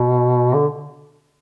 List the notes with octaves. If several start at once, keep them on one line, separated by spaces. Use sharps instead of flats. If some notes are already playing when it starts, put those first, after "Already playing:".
Already playing: B2
D3